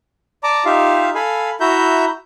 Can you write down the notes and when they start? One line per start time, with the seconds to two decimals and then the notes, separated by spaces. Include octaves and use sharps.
0.43 D5 A5 A#5 D6
0.65 D#4 F4 G4 E5 F5
1.15 A4 F5 G#5 B5
1.60 E4 F#4 E5 A#5 G6